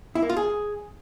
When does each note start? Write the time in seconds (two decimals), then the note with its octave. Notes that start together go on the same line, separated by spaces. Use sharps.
0.15 E4
0.22 A#3
0.30 F4
0.37 G#4